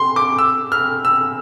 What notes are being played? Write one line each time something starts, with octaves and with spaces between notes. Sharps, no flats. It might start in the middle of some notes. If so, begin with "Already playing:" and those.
Already playing: C6
D6
E6
F6
E6